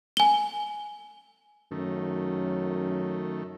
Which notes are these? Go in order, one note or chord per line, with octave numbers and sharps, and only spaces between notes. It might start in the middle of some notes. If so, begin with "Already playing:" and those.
G#5 G7
F#2 D#3 A3